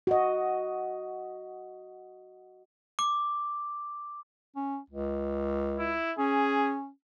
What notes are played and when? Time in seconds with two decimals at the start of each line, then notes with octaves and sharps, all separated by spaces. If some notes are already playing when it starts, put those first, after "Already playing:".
0.07 F#4 D#5
2.99 D6
4.56 C#4
4.90 C#2
5.79 E4
6.19 C#4 G#4